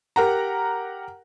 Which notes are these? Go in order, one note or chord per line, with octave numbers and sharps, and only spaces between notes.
G4 A#4 F#5 A#5